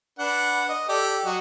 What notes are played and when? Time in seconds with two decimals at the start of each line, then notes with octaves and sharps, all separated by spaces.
0.19 D4 B4 F#5
0.69 D#5
0.89 G4 A4 D5
1.25 F#3 F#4 D#5